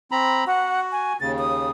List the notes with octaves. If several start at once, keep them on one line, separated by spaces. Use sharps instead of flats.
C4 A#5 B5
F#4 F#5
G#5
D#2 C#3 A6
D#6